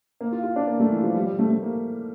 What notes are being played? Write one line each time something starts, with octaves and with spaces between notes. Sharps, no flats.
A#3
F4
F4
D4
A#3
A3
E3
F3
G3
G3
A3
A3
A#3